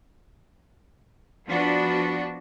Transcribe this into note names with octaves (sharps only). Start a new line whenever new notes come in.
F3 B3 D4 F#4 B4